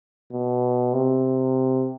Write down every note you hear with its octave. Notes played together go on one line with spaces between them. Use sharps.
B2
C3